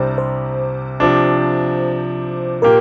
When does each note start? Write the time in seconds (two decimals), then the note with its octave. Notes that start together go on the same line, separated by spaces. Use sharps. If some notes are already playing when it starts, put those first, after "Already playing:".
Already playing: C2 C3 G3 D4 C5
0.18 C5
1.00 C3 F3 D4
2.62 A#2 A#3 G4 A#4